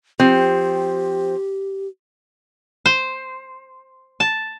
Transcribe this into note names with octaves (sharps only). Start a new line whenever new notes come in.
F3 C4 G4
C5
A5